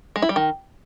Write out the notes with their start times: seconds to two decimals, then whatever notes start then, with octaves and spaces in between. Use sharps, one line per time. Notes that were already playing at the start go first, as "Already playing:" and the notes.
0.16 G#3
0.22 E4
0.29 G3
0.36 D#3